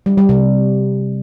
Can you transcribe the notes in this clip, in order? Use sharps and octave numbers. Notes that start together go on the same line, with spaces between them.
G3
G3
C3